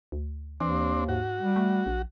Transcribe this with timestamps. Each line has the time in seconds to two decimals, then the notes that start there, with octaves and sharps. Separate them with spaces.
0.12 D2
0.60 D#2 E3 C4 D4
1.09 G#2 F#4
1.40 G3
1.56 A3
1.86 A#1